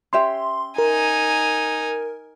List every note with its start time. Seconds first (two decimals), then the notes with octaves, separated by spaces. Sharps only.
0.13 C#4 G4 E5 C6
0.78 D#4 A#4 G#5